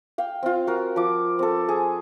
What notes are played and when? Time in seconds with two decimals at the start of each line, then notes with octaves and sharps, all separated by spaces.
0.18 F5 G5
0.43 C4 F4
0.67 F#4 A#4
0.96 F3 D6
1.39 C4 A4
1.68 G#4